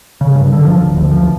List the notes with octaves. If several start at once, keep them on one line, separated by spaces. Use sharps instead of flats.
C#3
G2
D3
F3
D1
D2
F3
C#2